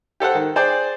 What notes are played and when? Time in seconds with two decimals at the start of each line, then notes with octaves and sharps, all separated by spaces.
0.20 G4 A4 C5 F#5
0.35 D#3
0.56 G#4 C5 D5 G5